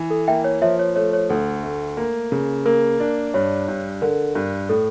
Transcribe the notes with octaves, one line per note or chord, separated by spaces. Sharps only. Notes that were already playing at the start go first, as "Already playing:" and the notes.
Already playing: E3
A4
A#3 E5 G5
C#5
F3 C#5 E5
C#5
A3 C#5
C#5
D2 A4
A3
A#3
C#3
A#3 A#4
D4
G2 C#5
G2
D3 A#4
G2
A2 A4